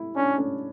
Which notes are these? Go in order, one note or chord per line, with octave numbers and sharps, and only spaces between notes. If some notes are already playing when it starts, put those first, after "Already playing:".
Already playing: E4
C#4 D4
C#4